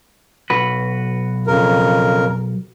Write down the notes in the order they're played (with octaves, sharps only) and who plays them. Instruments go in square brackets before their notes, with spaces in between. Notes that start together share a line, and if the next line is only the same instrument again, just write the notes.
[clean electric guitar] B1 F#4 B4
[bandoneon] F2 C#3 A#4